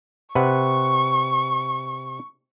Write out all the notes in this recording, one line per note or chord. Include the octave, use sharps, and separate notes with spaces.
C3 B4 F#5 C#6